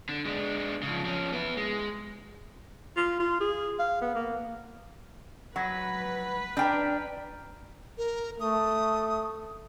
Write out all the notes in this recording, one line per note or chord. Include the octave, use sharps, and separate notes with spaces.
D3
G#3 D4
C#3 F3
F3 C#4
B3 E4
G#3
F4
F4
G#4
F5
B3
A#3
F#3 B4 F#5 G#6 A#6
D4 G5 A#5 F6 G6
A#4
A3 D#6